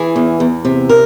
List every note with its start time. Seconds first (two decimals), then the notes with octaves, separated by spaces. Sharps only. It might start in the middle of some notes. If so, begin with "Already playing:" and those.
Already playing: E3 G#4
0.16 E2
0.40 E2
0.65 C3
0.89 A#4